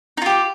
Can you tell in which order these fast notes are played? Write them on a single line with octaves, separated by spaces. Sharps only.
D#4 F4 G4